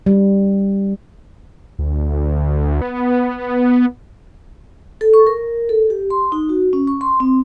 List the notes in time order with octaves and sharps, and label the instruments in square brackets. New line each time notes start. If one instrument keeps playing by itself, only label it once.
[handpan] G3
[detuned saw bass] D2
B3
[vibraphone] A4
C#6
A#4
A4
G4
C6
D#4
F#4
C#4
C#6
C6
C4